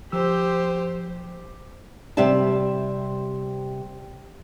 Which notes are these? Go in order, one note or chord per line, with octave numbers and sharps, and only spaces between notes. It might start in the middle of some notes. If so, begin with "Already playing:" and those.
F3 G4 C5 E6
C3 G3 G4 E5 A5